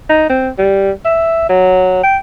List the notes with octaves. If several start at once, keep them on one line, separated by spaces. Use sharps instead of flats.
D#4
C4
G3
E5
F#3
G5